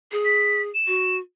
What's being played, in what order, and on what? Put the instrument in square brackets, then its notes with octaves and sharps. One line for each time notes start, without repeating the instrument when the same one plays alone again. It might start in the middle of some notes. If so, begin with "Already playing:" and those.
[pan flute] G#4
[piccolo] B6
E7
[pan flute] F#4